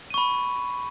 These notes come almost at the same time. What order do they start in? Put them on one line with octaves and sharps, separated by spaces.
D#7 C#6 B5